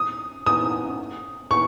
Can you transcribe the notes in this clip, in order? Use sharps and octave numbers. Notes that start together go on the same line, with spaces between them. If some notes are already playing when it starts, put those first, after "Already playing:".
Already playing: D#6
D#6
C#6